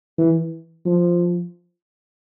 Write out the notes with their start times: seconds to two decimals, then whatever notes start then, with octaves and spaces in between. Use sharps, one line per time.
0.18 E3
0.85 F3